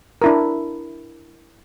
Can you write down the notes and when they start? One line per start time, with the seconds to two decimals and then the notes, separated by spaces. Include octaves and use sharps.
0.22 D4 E4 A#4